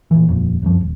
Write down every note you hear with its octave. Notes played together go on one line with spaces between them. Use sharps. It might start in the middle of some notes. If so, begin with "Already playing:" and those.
A#2 E3
D#1 G#1 F2 A#2
C2 F#2 F3
D#1